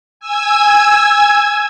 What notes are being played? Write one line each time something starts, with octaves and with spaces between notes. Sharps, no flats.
G#5 E6 G#6